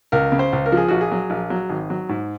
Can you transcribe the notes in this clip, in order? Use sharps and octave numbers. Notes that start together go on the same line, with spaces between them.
C#2 A#4
C#3
C5
C#2
A#4
F3 G#4
A#1 F#4
G#4
F#3
A#1
F#3
G#1
F#3
G#2